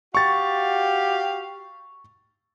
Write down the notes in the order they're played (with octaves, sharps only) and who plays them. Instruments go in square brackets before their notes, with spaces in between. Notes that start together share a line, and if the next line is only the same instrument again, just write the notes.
[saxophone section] F#4 G4 F5 [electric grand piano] C#6 A6